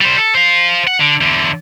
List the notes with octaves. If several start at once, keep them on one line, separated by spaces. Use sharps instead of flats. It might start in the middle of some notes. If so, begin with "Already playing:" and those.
G3 C5
A4
C5 F5
F#5
D3
E2 D3